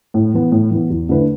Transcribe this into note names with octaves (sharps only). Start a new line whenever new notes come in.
A2
E3 B3
A2
E3 B3
E2
D3 A3 E4 B4